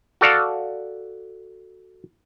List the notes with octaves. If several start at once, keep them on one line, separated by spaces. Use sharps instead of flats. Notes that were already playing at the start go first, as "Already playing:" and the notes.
F#4 A4 D5 F5